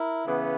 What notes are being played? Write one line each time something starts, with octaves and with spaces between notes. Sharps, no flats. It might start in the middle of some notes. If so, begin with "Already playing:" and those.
Already playing: E4 A#4
C#3 E3 B3